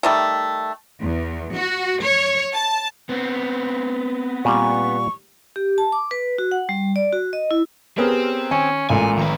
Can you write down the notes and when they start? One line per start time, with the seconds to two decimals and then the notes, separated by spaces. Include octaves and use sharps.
0.03 D#3 G3 A3
1.00 E2
1.55 F#4
2.03 C#5
2.54 A5
3.09 B3 C4
4.45 A#2 G3 C#6
5.56 G4
5.78 A5
5.92 D6
6.11 B4
6.38 F#4
6.51 F#5
6.69 G3
6.96 D5
7.13 F#4
7.33 D#5
7.51 E4
7.98 B3 C4 G4 G#4 A#4 C#5 F6
8.51 D#3 C#4 G#5
8.90 A1 A#2 G#3 A4 G#5 D#7
9.18 F2 D#3 B4 A#5 E7